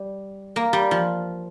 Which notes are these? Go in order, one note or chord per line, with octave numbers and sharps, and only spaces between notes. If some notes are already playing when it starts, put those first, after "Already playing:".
Already playing: G3
A#3
G3
F3